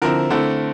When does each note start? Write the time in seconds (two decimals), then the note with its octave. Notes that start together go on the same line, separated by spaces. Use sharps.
0.02 D3 F3 C4 E4 A#4
0.31 D3 A3 C4 E4